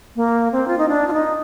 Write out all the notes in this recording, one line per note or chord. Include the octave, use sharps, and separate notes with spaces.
A#3
C4
F4
D#4
D4
F4
D#4